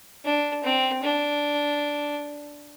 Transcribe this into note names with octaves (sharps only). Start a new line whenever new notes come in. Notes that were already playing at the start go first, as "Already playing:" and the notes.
D4
C4
D4